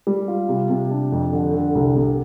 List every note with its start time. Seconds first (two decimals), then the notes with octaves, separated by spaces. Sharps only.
0.07 G3
0.28 F4
0.49 C3
0.70 C3
0.91 D4
1.12 F2
1.33 D3
1.54 D3
1.75 C2
1.96 C3